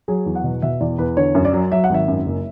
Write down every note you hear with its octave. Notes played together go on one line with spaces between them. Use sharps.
F#3 G#4
E2
F#5
B2
B2 E5
E2 D5
E2 B4
D3 C#5
F#2
D5
F#3
F#3 E5
F#5
G#1 E5
F#2
F#1